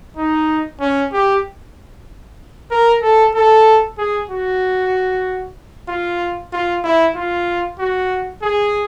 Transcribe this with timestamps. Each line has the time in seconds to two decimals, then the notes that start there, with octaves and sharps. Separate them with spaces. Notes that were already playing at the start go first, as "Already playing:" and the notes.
0.17 D#4
0.80 C#4
1.13 G4
2.71 A#4
3.02 A4
3.35 A4
3.98 G#4
4.30 F#4
5.89 F4
6.53 F4
6.84 E4
7.16 F4
7.80 F#4
8.42 G#4